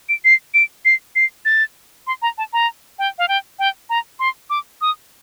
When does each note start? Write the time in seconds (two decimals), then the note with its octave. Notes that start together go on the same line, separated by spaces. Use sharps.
0.09 D7
0.25 C7
0.54 D7
0.85 C7
1.16 C7
1.45 A6
2.07 C6
2.22 A#5
2.38 A5
2.53 A#5
2.99 G5
3.18 F5
3.28 G5
3.59 G5
3.90 A#5
4.19 C6
4.50 D6
4.81 D#6